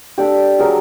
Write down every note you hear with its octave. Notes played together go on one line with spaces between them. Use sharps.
D4 G4 A4
F#3 G#4 A#4